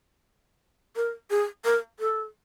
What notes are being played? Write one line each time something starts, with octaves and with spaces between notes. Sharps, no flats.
A#4
G#4
A#4
A4